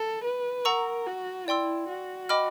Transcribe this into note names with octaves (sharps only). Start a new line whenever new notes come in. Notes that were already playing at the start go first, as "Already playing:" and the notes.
Already playing: A4
B4
A#4 F#5 A#5 C#6 E6
F#4
E4 D5 G5 C6 E6
F#4
D#5 G5 B5 D6 F6